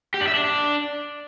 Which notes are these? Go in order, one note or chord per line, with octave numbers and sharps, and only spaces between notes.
G4
D4
E5
D4